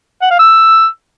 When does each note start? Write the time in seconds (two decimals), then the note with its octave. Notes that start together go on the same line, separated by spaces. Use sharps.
0.22 F#5
0.31 F5
0.39 E6